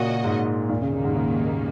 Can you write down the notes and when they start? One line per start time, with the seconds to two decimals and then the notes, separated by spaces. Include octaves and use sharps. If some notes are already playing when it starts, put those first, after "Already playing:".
Already playing: A#2 C#3 A#3 F#4 D#5
0.24 G#2
0.69 D#2 A#2 D#3 A#3
0.82 C#3
0.93 C#3
1.04 G#2
1.15 C#3